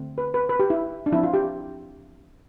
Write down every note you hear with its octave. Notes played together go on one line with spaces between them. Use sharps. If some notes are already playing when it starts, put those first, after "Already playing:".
Already playing: D3 A3 C4
B4
B4
B4
G4
E4
D4
F3 C4 E4
F4
G4